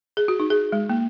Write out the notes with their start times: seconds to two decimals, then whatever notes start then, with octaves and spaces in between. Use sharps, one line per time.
0.17 G#4
0.28 F#4
0.40 D#4
0.50 G#4
0.72 G#3
0.89 A#3